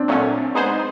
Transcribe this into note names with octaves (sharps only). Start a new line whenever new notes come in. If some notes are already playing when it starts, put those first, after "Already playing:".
Already playing: C4 D4
A#2 F#3 A3 C#4
G#3 B3 D#4 G#4 C5